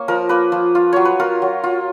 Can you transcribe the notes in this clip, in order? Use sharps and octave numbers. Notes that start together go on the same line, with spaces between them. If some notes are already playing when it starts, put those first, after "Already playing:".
Already playing: A#3 C#4 C#5
F3 A#4
A#3 B4
F3
F4
F#3 C#5
B4
F4 A#4
F#3
F4